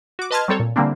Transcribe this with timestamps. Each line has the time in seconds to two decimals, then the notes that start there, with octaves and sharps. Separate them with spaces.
0.19 F#4 D6
0.31 B4 D#5 A5 C6 F6 G#6
0.48 F#3 G3 C4 A4 C#5
0.60 A#2
0.76 D3 E3 G3 A#3 C4 D4